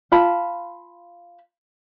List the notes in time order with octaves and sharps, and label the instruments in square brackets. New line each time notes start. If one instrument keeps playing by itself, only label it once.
[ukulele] F4 A5 B5